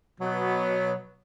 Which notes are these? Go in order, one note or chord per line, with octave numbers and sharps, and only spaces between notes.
B2 F#3 B3